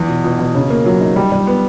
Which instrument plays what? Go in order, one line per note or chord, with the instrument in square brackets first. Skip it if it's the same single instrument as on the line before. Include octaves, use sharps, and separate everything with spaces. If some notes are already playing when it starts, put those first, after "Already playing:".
Already playing: [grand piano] E2
B2
B2
B2
C#3
A#3
F#3
D#4
G3
G3
B3